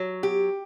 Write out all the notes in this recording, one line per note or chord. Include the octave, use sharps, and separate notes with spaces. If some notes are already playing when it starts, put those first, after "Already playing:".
Already playing: F#3
G4